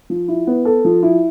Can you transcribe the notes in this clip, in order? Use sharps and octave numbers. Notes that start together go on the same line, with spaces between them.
F3
E4
B3
A4
F3
E4